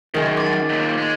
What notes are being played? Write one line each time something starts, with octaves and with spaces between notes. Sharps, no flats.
F#2 D#3 G#3
D6 A6
D#2 A#2
G#3